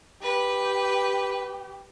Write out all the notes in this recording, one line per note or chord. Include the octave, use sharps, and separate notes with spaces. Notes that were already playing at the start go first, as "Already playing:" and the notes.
G4 B4